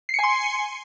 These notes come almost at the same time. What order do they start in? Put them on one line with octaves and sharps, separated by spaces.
C7 C#7 G#5 C6